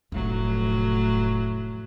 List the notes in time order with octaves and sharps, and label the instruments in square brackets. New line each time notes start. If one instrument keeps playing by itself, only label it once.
[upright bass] F1 [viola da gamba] A2 F#3